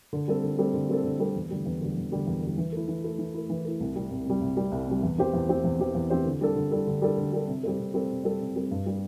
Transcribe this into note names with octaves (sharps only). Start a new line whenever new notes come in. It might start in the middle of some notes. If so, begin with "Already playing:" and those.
D3
G3 C4 A4
D3
G3 C4 A4
D3
G3 C4 A4
D3
G3 C4 A4
E2
D3 G3
E2
D3 G3
E2
D3 G3
E2
D3 G3
E3
A3 E4
E3
A3 E4
E3
A3 E4
E3
A3 E4
C2
C3 G3
C2
C3 G3
C2
C3 G3
C2
C3 G3
E2
E3 C4 G4 C5
E2
E3 C4 G4 C5
E2
E3 C4 G4 C5
E2
E3 C4 G4 C5
D3
G3 D4 A4
D3
G3 D4 A4
D3
G3 D4 A4
D3
G3 D4 A4
C3
G3 C4 A4
C3
G3 C4 A4
C3
G3 C4 A4
C3
G3 C4 A4
G2
G3 D4 G4